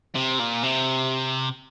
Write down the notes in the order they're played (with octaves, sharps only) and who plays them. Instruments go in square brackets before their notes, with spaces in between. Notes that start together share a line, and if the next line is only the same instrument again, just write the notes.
[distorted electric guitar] C3
A#2
C3